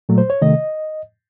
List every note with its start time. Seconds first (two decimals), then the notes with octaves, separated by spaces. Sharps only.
0.09 A#2 F#3 A3
0.18 C5
0.30 C#5
0.42 C3 D#3 A3 D#5